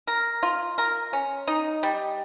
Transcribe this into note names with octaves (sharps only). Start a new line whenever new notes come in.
A#4
F4
A#4
C#4
D#4
G3